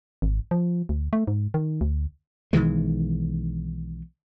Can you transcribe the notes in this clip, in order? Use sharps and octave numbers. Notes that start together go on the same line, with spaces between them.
G#1
F3
D2
A3
G#2
D#3
D2
B1 D#3 E3 G#3